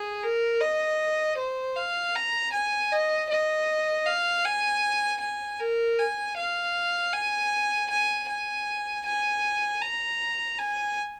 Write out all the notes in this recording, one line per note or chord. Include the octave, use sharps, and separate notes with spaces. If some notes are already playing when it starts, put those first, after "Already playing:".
Already playing: G#4
A#4
D#5
C5
F5
A#5
G#5
D#5
D#5
F5
G#5
G#5
A#4
G#5
F5
G#5
G#5
G#5
G#5
A#5
G#5